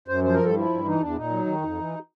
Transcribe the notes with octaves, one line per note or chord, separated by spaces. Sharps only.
F#2 C5
F3 C5
A#4
G2 A4
F3 E4
G2
E3 D#4
E2 D4
A#2 D#4
F#3
D#3
F2
E3